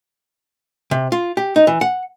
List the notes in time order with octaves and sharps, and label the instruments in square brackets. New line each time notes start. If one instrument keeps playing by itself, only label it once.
[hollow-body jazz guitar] C3
F4
G4
D#4
E3
F#5